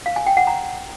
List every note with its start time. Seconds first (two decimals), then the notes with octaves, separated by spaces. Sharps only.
0.06 F5
0.16 G#5
0.27 G5
0.37 F#5
0.47 A#5